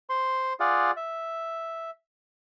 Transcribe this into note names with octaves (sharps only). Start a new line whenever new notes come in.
C5 C6
F4 G#4 D5 F5 F#5
E5